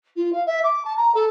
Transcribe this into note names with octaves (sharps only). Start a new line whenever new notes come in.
F4
F5
E5
D6
A5
A#5
A4